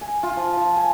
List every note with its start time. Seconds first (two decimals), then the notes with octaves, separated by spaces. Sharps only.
0.01 G#5
0.23 F4
0.37 F3
0.57 F3
0.76 G#5